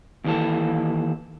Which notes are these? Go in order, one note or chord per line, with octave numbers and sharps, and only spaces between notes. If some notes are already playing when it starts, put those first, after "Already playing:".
D#2 E3 A4